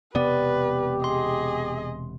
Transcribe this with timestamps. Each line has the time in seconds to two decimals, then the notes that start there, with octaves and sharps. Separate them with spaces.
0.15 E1 C3 B3 G4 B4 D5
1.04 G#4 D#5 C6